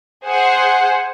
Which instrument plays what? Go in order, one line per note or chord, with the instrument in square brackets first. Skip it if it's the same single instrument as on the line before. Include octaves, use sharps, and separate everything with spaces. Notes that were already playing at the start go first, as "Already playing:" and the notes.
[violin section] G#4 C5 F#5 G#5